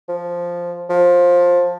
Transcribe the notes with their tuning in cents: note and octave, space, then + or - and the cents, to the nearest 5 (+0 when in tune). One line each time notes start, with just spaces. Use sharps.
F3 +0
F3 +15